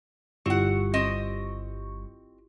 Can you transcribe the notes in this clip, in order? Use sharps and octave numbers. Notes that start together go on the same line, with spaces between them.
G1 G3 C4 E4 F4 G4 F#5 C#6
C4 D#5